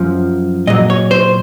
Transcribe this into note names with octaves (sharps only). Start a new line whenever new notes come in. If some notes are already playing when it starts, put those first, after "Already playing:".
Already playing: F#2 F3
A#2 F#3 D#5
C#5
C5